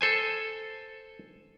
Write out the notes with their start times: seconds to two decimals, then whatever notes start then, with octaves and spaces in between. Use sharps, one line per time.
0.01 A4 C5 G#5